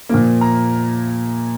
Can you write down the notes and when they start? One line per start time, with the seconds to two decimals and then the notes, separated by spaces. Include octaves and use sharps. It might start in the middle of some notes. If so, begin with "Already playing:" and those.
0.09 A#2 F3 A#3
0.41 A#5